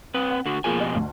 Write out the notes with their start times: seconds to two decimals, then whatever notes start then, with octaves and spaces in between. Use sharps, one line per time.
0.14 C4 B4
0.30 F#5
0.46 D3 F#4
0.64 F2 B2 A#3 F4 G#4 G#5
0.79 G4 D#5
0.95 D2